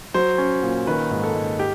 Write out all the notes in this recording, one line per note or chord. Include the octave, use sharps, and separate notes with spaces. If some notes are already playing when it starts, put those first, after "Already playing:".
F#3 C5
C#4
A#2
D#3 B4
G#2
A4
G#2
G4